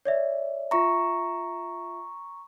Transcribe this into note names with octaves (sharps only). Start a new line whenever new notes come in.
C#5 D5 E5
F4 E5 A#5 C#6